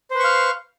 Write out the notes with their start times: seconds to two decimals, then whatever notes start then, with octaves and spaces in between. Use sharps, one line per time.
0.11 C5
0.15 B4
0.19 C#6
0.24 F5